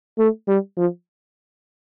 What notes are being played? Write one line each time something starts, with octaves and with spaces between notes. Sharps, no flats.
A3
G3
F3